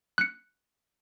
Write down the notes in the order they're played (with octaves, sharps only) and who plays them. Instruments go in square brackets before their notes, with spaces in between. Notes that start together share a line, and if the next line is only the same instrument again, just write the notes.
[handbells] F#6 C#7